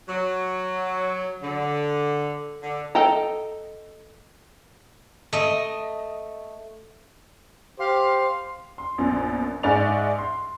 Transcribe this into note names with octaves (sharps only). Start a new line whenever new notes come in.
F#3
D3
D3
A4 D#5 G5 A5 A#5
A3 D#5
G4 C5 F5 C6
C6
A#1 F#2 B2
G#2 G#3 D5 E5 C#6 F7
C6